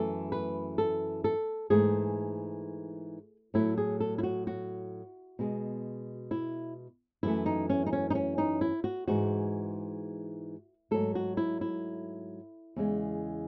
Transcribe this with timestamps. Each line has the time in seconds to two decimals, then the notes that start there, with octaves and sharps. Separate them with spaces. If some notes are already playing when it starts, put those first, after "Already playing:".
Already playing: F#2 E3 A3 A4
0.32 B4
0.78 A4
1.24 A4
1.70 G#2 E3 A3 G#4
3.54 A2 F#3 A3 E4
3.77 G#4
4.00 A4
4.18 E4
4.23 F#4
4.47 F#4
5.39 B2 G#3
6.31 E4
7.23 F#2 E3 A3 E4
7.46 D#4
7.70 C#4
7.86 D#4
7.93 C#4
8.10 D#4
8.15 C#4
8.38 D#4
8.61 E4
8.84 F#4
9.08 G#2 E3 G#3 F#4
10.91 G#2 F#3 A3 A4
11.15 F#4
11.37 E4
11.61 E4
12.76 E2 C#3 G#3